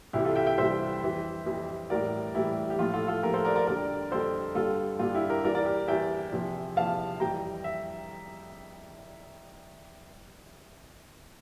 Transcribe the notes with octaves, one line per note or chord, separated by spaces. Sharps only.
C2 C3 E3 G3 E4 G4
F4 A4
E5 G5
E5 G5
C2 C3 E3 G3 C5 E5
F2 E3 G3
F2 E3 G3
A2 E3 G3 A#4 D5
A2 E3 G3 E4 G4
G4
A2 F3 F4
F4 A4
F4 A4
A2 F3 G4 A#4
A4 C5
A#4 D5
A#4 D5
F2 D3 G3 A#4 D5
F2 D3 G3 A4 C5
G2 D3 G3 F4 A4
G2 D3 G3 F4
E4 G4
G4 A#4
E2 E3 G3 A#4 D5
A#4 D5
G4 A#4
E2 E3 G3 E5 G5
E2 C3 F3
E2 C3 F3 F5 A5
F2 E3 G3 G5 A#5
E5